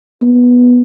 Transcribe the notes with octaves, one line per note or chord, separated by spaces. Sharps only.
B3